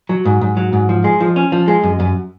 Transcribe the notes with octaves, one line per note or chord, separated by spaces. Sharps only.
F#3
G#2
G#2
F#3
G#2
F3
G#3
F3
C#4
F3
G#3
F#2
F#2